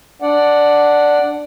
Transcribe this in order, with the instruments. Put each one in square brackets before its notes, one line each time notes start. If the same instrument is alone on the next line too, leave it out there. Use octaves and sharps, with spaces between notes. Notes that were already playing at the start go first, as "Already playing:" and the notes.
[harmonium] D4 D5 F#5